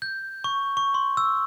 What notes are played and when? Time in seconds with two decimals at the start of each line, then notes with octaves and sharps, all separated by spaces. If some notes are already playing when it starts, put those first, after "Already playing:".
0.02 G6
0.44 C#6
0.77 C#6
0.94 C6
1.17 E6